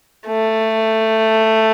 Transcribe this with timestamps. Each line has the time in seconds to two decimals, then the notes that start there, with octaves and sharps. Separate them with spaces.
0.27 A3